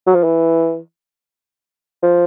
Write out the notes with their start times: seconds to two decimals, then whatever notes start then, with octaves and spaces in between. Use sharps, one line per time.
0.07 F#3
0.15 F3
0.24 E3
2.02 F3